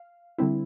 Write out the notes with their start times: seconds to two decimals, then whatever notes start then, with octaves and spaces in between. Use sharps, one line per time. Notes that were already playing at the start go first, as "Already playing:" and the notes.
Already playing: F5
0.38 D3 G3 C4 E4